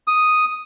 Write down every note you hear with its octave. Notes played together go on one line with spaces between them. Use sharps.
D#6